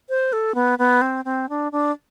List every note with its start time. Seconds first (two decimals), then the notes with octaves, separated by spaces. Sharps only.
0.09 C5
0.33 A4
0.55 B3
0.79 B3
1.01 C4
1.25 C4
1.49 D4
1.72 D4